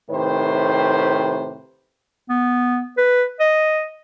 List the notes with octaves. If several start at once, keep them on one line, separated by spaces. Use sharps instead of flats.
A2 C3 D#3 B4 C5
B3
B4
D#5